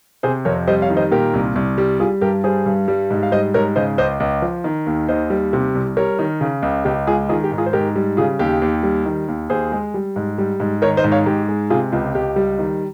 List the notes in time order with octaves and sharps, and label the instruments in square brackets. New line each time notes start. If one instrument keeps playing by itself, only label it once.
[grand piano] C3 G#4 C5
F2 A#4 C#5
G3 C5 D#5
C#5 F5
D#3
C5 D#5
A#2 G4 A#4
C2
C2
G3
G3 F4 G#4
G2 G4 A#4
G3 G#4 C5
G2
G3
G#2
F5
G3 C5 D#5
G#2 A#4 C#5
C#3 C5 D#5
C#2 C5 D#5
C#2
F3
D#3
D#2
D#2 C5 D#5
G3
C3
C2
G3 A#4 C#5
D#3
C#3
C#2
C#2 G4
G#3 F4 G#4
D#3 F4 G#4
G4
G#2
F4 G#4
C5
G#2 G4 A#4
G3
C#3 F4 G#4
D#2 G4
D#2
G3
D#3
D#2
D#2 G#4 C5
G#3
G3
G#2
G3
G#2
D#3 A#4 C#5
C5 D#5
G#2
C#5 F5
G#2 G4
G#3
C3 F4 G#4
C#2 F4
C#2 G4
G3
D#3